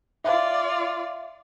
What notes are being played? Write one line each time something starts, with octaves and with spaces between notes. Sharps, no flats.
F4 D5 E5 F5